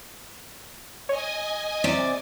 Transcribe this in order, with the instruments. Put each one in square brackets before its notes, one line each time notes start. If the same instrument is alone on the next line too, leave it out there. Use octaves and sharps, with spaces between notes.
[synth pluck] C#5 [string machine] D#5 G#5
[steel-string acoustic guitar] C3 D5